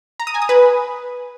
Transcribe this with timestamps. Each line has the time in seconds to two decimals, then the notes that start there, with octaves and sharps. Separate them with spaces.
0.20 A#5
0.27 D#6
0.34 G#5
0.42 D#6
0.49 B4